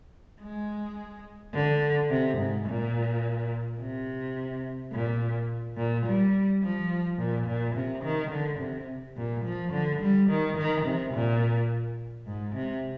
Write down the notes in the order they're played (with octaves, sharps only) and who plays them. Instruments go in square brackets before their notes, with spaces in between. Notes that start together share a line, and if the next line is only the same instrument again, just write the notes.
[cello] G#3
D3
C3
G#2
A#2
C3
A#2
A#2
G3
F3
A#2
A#2
C3
D#3
D3
C3
A#2
F3
D3
G3
D#3
D#3
C3
A#2
G#2
C3